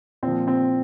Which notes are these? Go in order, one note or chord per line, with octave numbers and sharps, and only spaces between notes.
A#2 F3 C4
C4